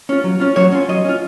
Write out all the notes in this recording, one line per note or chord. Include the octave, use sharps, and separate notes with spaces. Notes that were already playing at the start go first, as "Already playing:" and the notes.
C#4 F4
F#3
C#4 F4
F#3 C#5
C#4 F4
F#3 D#5
C#4 F4